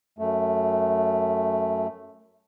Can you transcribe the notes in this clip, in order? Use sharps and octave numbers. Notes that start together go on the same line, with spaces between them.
F#2 A3